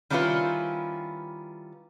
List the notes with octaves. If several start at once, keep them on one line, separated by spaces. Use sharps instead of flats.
D#3 G3 C#4 E4 F4 B4